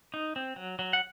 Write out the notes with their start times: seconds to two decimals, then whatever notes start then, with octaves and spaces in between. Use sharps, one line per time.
0.14 D#4
0.36 C4
0.56 F#3
0.79 F#3
0.93 F#5